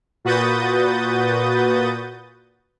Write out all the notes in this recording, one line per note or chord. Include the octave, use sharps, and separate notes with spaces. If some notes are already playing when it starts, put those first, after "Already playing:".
A#2 F#4 B4 D#6 G6 A6